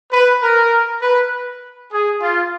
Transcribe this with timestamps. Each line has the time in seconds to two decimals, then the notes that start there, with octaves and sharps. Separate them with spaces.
0.11 B4
0.42 A#4
1.02 B4
1.91 G#4
2.21 F4